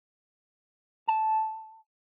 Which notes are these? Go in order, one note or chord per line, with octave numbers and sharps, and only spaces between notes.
A5